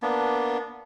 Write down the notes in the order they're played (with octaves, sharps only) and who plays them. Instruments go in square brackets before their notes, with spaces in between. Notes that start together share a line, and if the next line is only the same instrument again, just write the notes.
[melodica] A#3 B3 D4